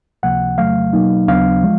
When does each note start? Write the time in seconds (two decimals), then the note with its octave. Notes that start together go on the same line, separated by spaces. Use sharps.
0.23 C#2 C3 F3 A#3 F#5
0.58 F2 C#3 F#3 A3 F5
0.93 B2 F#3 A#3 D#4
1.28 D#2 C#3 F#3 B3 D4 F5
1.64 F3 G#3